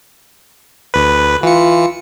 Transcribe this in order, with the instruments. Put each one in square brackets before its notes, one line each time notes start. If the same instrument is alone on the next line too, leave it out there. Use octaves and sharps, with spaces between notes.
[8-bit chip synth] D2 B4
[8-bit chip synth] E3 C#7 [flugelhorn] F4